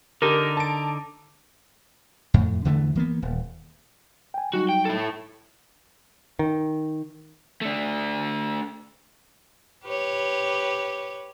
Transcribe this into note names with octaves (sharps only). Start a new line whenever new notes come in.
D3 D#4 G4 A#4
A5 D7
F2 A2
E2 D3 E3 A3
E3 A#3 B3
D#1
G5 G#5
F#3 G3 D#4 F#4
G5
E4 A4
D#3
A3 D4
G4 B4 C#5